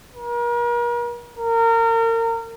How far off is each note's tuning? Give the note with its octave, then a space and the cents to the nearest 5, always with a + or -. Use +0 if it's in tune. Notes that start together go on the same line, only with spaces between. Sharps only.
A#4 +40
A#4 -30